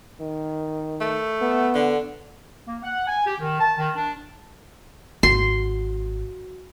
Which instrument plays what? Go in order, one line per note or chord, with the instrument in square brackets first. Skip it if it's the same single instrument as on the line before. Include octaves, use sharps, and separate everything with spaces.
[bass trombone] D#3
[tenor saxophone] A3
[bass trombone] B3
[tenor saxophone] D3
[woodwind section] A#3
F#5
G#5
G4
D#3
A5
D#3
D4
[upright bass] G#1 [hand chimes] F#4 [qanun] C6